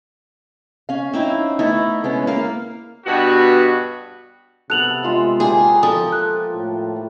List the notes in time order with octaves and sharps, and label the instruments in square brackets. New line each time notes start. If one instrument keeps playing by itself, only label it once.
[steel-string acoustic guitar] C#4 F5
[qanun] C4 D#4 E4
[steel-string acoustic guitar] A3 B3 D#4 [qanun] E4
[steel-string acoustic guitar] G#3 B3 C#4
[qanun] A#3 F5
[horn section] G2 B2 B3 F#4
[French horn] C3 [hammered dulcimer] B3 A4 [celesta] F#6 F7 F#7
[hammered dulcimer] G#3 F4 E5
[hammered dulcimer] A#3 G4 [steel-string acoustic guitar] G#4
[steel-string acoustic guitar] F3 [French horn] A4 [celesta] D#6
[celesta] F#6
[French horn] A2